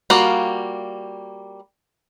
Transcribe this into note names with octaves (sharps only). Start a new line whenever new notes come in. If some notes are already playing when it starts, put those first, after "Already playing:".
G3 A#3 F4 F#4 F#5